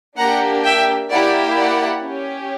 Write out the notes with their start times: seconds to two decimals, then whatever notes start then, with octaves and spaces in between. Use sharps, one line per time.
0.17 A#3 D4 G4 F#5 A#5
0.64 E5 G5
1.10 A#3 E4 G4 D5 F#5
1.57 D5 F#5
2.03 C#4 G4